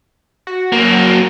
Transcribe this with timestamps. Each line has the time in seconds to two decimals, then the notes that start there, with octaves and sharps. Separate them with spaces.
0.47 F#4
0.72 F#2 A#3